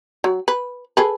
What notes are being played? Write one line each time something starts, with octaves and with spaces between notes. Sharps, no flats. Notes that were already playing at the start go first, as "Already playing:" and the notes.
F#3
B4
G#4 A4 B4